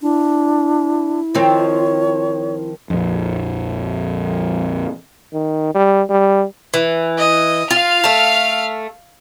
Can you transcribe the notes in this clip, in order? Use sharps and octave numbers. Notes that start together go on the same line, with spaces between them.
D4 E4
D#3 F3 C4 C#5
A#1 F2
D#3
G3
G3
E3
D#5
F4 F5 F6
A3 A5